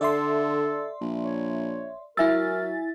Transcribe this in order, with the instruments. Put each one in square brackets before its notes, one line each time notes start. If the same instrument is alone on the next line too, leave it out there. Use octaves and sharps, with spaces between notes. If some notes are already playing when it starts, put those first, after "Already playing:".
[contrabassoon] D3 [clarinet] A4 [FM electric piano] D5 E5 C6
[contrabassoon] A#1
[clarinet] C#5
[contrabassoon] F#3 [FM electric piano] E4 G#5 A6 [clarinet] A#4 [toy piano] E5 E6